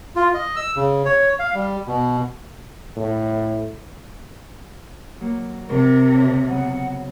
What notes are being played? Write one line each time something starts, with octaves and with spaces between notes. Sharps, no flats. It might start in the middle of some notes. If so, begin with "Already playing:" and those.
F4
D#5
E6
C#3
C#5
F5
G3
B2
A2
F#3 A#3
C3 A#4
C#3 C4
C#3 F#3 B3 F#5